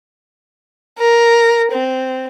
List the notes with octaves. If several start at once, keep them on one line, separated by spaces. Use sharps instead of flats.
A#4
C4